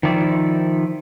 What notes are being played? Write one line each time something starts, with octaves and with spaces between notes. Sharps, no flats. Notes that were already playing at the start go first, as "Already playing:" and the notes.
D#3 F3 E4 D5